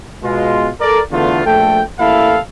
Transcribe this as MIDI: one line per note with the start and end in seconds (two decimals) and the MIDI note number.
0.24 0.70 47
0.24 0.70 56
0.24 0.70 65
0.81 1.00 69
0.81 1.00 70
0.81 1.00 74
1.12 1.43 40
1.12 1.43 50
1.12 1.43 57
1.12 1.43 59
1.12 1.43 65
1.46 1.82 34
1.46 1.82 57
1.46 1.82 69
1.46 1.82 79
1.99 2.39 33
1.99 2.39 58
1.99 2.39 64
1.99 2.39 69
1.99 2.39 77